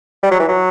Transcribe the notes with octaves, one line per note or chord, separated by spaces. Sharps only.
G3
F#3
E3
F#3